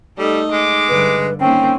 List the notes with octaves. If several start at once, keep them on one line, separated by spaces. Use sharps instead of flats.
G3 A3 D#4 A4 D#5
G#3 D6
G2 D3 B4
D#3 A#3 C4 C#4 G5